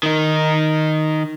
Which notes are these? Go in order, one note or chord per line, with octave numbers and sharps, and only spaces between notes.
D#3 D#4